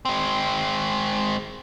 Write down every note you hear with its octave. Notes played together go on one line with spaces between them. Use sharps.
G#3 C4